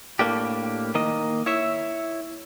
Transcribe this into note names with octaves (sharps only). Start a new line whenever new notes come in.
A2 A#3 D4 G4
D#3 A#3 D#5
E4 C#5 E5